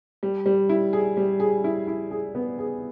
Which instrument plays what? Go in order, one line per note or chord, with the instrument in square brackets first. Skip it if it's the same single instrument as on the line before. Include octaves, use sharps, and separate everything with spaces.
[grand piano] G3
G3
E4
G#4
G3
G#4
E4
E4
G#4
B3
G#4